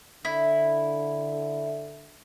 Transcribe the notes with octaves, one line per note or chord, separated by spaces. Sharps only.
D3 E4